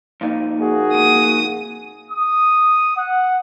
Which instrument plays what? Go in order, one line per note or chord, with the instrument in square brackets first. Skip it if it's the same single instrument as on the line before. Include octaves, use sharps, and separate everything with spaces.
[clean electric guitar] F2 A#2 D#4
[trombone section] A#3 F#4 G#4
[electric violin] D#6
[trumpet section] D#6
F#5